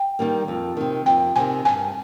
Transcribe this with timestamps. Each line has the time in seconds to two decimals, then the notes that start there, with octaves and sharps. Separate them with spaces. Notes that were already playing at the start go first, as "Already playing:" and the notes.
Already playing: G5
0.19 D#3 G3 A#3
0.48 F2
0.77 C3 D#3
1.06 F2 G5
1.36 C3 D#3 G#5
1.65 G2 G#5